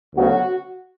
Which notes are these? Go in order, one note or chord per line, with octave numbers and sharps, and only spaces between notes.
D2 C#3 F#3 B3 F#4